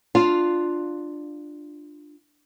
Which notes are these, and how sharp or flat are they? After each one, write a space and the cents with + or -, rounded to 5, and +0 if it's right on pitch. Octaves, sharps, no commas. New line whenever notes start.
D4 +15 F4 +0 F5 -5